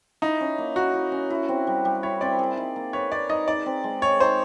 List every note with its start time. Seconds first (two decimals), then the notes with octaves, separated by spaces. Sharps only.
0.22 D#4 E4
0.41 C#4
0.58 A#3
0.76 A#3 F#4
0.94 E4
1.12 C#4
1.30 E4
1.49 C4
1.67 G3
1.85 G3
2.03 E4 C#5
2.21 C4 D5
2.39 G#4
2.57 D#4
2.76 A#3
2.93 B4 C#5
3.12 G#4 D5
3.29 D#4 D#5
3.48 D#4 D5
3.66 C4
3.84 G#3
4.02 G#3 C#5
4.20 D#4 C5